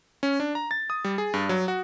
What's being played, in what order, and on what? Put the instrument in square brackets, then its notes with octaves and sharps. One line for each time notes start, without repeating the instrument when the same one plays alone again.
[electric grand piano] C#4
D4
A#5
A6
D#6
G3
G#4
G2
F#3
F#4